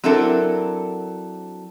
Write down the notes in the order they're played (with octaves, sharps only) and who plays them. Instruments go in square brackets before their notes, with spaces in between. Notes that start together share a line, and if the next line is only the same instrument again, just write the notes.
[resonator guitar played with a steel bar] F#3 C4 D4 E4 A4 A#4